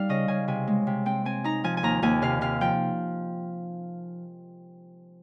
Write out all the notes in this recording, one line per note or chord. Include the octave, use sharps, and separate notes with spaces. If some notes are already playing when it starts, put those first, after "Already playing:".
Already playing: G3 D#4 F5
C#3 D#5
C#3 G#5
C3 G#5
G#3
C3
C4 G5
C4 G#5
D#4 A#5
F3 G#5
G#5
D#2 A#5
D#2 G#5
C3 F5
C3 F5
F3 G5